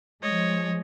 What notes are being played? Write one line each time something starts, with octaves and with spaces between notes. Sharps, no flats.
F3 G#3 C#5 D#5